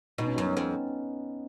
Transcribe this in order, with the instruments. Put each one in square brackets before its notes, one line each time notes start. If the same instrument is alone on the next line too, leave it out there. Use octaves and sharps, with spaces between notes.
[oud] B2 [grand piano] D#4
[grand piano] C#4
[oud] F#2 [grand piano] B3
[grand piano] C#4
[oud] F2 [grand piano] C#4